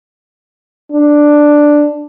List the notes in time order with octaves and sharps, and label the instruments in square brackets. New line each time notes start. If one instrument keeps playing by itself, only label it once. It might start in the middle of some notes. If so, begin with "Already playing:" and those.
[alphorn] D4